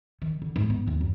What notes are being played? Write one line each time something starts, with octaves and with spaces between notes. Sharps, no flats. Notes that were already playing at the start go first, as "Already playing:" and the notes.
D#3
D3
G#2
B3
D#2
F#2